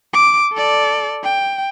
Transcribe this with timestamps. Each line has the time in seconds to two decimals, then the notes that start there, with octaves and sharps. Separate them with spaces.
0.14 D6
0.53 A4 D5
1.24 G5